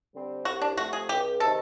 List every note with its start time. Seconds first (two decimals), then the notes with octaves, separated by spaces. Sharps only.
0.14 D3 G3 C4
0.45 C2 F#4
0.62 D4
0.77 C3 F3 A3 F#4
0.93 G#4
1.09 C#2 G4
1.40 C3 D#3 A4